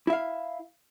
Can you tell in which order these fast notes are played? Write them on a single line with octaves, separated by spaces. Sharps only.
E4 E5 F5